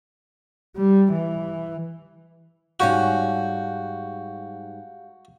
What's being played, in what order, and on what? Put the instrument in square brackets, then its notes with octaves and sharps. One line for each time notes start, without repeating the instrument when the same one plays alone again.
[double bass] G3
E3
[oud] G#2 G3 C#4 [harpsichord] F#4 [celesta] G4 F5 G6